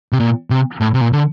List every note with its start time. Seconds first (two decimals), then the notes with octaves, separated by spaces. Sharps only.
0.12 C3
0.20 A#2
0.50 C3
0.81 A2
0.94 C3
1.01 A#2
1.13 D3